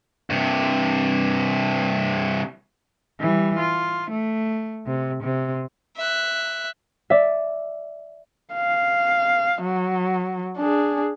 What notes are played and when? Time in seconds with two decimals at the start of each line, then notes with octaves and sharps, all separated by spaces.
0.30 G2 C3
3.20 E3 G3
3.58 F4
4.10 A3
4.87 C3
5.22 C3
5.97 E5 F#6
7.10 D5 E5
8.54 F5
9.62 F#3
10.57 D4 G#4